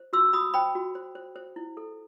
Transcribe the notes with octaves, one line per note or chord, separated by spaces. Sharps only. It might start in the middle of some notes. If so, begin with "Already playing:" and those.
Already playing: C5
F#4 C6 E6
F#4 B5 D#6
C5 G5 B5
F#4
C5
C5
C5
E4
A4